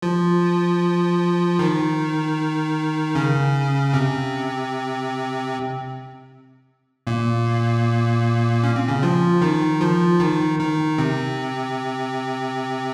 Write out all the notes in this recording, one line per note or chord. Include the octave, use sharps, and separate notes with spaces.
F3 F4
D#3 D#4
C#3 C#4
C3 C4
A#2 A#3
C#4
C4
C#3 C#4
F3 F4
D#3 D#4
F3 F4
D#3 D#4
D#3 D#4
C3 C4